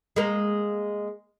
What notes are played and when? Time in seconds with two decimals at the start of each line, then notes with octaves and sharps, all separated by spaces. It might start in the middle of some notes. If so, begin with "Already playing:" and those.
0.16 G#3 A#3